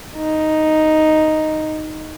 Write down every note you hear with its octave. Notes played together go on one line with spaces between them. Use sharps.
D#4